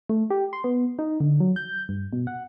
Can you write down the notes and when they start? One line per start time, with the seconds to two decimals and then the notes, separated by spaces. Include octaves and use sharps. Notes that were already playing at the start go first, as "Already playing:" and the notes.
0.09 A3
0.30 G4
0.53 C6
0.64 B3
0.99 D#4
1.20 D3
1.40 F#3
1.56 G6
1.89 G2
2.13 B2
2.27 F#5